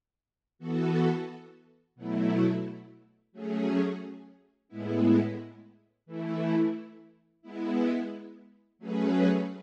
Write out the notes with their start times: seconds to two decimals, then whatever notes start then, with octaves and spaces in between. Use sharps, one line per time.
0.59 E3 B3 F#4 A4
1.95 B2 F#3 A3 E4
3.32 F#3 A3 C#4 G#4
4.68 A2 G#3 B3 E4
6.06 E3 A3 E4
7.42 G#3 B3 E4
8.79 F#3 A3 C#4 G#4 B4